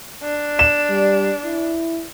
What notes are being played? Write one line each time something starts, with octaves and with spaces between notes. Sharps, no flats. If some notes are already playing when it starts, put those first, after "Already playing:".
D4
E7
G3
E4